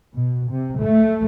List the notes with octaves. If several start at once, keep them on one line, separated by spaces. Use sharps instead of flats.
B2
C3
A3